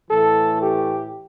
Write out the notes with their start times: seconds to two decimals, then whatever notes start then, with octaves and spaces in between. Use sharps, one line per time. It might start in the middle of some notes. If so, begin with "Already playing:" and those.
0.09 A2 E3 A3 A4
0.61 G4